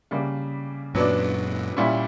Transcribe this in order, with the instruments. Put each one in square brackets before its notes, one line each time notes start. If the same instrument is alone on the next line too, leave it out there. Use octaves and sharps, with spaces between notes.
[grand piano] C#3 G3 A#3
[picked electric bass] F#2 A#2 [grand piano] F#3 B3 D4
[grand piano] A#2 G3 C#4 E4